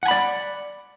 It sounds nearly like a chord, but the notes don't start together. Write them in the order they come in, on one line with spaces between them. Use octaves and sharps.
F#5 G#5 B5 D5